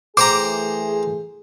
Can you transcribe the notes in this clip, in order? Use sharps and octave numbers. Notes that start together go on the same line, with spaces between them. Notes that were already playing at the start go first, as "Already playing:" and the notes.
E3 A3 G#4 C5 G5 A#5 D6